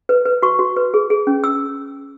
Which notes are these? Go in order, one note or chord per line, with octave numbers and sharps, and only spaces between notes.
B4
B4
F#4 C#6
F#4
B4
G#4
G#4
C#4
E6